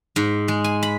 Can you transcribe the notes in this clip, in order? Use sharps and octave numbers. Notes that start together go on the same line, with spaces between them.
G#2
G#3
G#5
B5